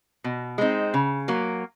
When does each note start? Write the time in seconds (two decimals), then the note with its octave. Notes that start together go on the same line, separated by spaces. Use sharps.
0.24 B2
0.58 G#3 C4 D#4
0.94 C#3
1.28 F#3 A#3